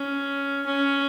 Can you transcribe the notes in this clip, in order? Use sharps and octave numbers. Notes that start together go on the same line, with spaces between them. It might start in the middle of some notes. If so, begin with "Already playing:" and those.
Already playing: C#4
C#4